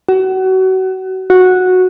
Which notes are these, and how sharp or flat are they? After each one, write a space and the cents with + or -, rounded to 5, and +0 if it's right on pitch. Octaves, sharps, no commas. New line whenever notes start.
F#4 +30
F#4 -10